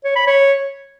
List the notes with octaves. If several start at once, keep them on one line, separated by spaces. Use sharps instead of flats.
C#5
B5
C#5